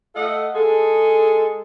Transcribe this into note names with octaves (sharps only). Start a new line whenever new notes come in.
A3 A4 D#5 F5 F#5
G#3 G#4 A4